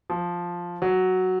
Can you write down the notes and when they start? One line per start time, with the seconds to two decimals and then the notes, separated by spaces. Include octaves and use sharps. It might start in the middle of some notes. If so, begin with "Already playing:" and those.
0.10 F3
0.82 F#3